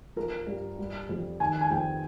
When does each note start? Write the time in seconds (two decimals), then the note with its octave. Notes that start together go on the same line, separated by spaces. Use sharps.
0.16 F3 A#4
0.47 G2
0.78 G3
1.09 F2
1.40 D#3 G#5
1.61 G#5
1.71 F2 G5